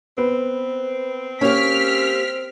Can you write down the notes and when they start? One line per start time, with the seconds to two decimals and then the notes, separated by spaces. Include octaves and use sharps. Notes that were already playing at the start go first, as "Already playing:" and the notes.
0.18 B3 C4
1.41 A#3 C#4 G4 F6 B6